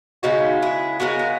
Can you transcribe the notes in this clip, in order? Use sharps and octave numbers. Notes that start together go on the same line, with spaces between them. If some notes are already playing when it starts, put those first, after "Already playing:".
C#3 G#3 B3 D#4 F#4
E4 G#4
C#3 G#3 B3 F#4 A#4
A#4